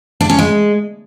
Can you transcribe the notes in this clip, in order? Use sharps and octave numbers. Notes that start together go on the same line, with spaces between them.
D4
C#4
G#3